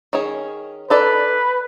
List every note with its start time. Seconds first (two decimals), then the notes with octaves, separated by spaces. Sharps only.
0.13 D#3 C#4 G#4
0.90 D#4 A4 B4 D5